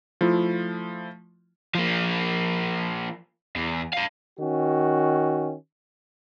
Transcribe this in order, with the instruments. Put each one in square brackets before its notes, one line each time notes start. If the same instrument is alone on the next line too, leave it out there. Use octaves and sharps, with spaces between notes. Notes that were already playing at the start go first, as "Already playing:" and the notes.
[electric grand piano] F3 A3 E4 F4
[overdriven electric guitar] F3 A#3
E2
B4 F5
[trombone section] D#3 C#4 F#4